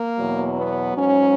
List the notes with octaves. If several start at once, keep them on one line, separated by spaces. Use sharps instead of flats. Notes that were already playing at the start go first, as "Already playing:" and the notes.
Already playing: A#3
E2 B2 F#3
B3
G#2 F#3 C#4